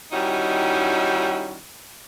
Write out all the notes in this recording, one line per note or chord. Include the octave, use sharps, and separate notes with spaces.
D#3 G3 C#4 D#4 E4 F#4